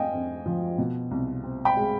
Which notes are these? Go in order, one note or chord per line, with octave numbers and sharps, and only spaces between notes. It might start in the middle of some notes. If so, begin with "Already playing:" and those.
Already playing: F2 D#5 F5 G5 G#5
F2
F3
B2
C2
C4
G5 B5
G#3